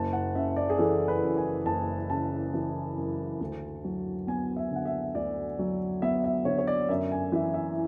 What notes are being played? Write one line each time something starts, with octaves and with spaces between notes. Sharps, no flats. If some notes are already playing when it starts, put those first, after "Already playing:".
Already playing: F#1 A5
F#5
C#3 E5
D5
G#4
E3 A4
B4
F#2
G#5
F#1 A5
C#3 A5
E3
F#2
D2
F#3
B3 G#5
E5
D3 F#5
E5
D2 D5
F#3
B3 E5
E5
D3 C#5
C#5
D5
F#2 E5
G#5
E3 E5
E5